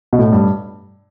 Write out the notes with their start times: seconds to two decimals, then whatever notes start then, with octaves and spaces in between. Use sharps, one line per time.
0.13 B2
0.19 A2
0.33 G2